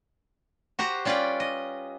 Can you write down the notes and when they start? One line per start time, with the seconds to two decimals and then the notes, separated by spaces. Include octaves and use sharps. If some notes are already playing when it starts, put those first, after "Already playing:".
0.79 F#4 G4 C5 A#5
1.05 G3 C#4 F4 B4 D5 G5
1.40 D#5